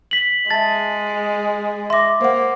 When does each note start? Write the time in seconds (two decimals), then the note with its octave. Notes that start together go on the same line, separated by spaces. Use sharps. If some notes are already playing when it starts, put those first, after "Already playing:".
0.11 B6 F#7
0.50 G#3 E5 A5 A6
1.90 E5 C6 D6 A#6
2.21 A#3 C5 F#5